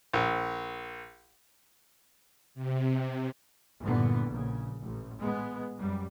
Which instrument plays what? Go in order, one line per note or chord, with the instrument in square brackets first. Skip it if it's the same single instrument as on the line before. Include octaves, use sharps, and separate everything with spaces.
[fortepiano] A#1
[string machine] C3
[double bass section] G1 A#2 D3 E3 B3
A#1 A#2 C#3
A1
G#3 B3
F#2 G3